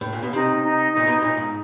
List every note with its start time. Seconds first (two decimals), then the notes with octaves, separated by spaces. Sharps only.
0.01 A2
0.12 A#2
0.22 B2
0.33 C3 D#4
0.63 D#4
0.93 A#2 D#4
1.07 B2
1.22 A#2 D#4
1.37 G#2